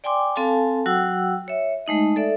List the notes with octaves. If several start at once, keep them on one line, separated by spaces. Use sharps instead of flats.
D5 G5 G#5 C6 D6
C4 A4 F5 G#5 A5
F#3 F#4 F#5 G5 E6
C#5 E5
G#3 A3 D#4 D#5
A4 D5 E5